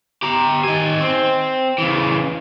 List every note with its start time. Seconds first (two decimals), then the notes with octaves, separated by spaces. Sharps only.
0.22 G4 A#5
0.64 D#3 G#5
1.00 C4
1.78 C#3 E3